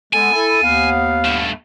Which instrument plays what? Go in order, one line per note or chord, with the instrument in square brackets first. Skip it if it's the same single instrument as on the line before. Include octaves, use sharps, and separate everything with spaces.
[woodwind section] G#3 B3 A4 [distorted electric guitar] G#5
[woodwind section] E4 A4
D#2 B3 F5
[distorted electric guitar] G2 A3